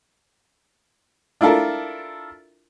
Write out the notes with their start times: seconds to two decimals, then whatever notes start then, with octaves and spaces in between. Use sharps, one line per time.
1.41 D4 E4 F4 A4 A#4